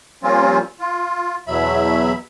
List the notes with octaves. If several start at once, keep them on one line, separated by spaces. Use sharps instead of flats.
F3 G3 A#3 C4 C#4 F4
F4
E2 B2 F#3 E5 B5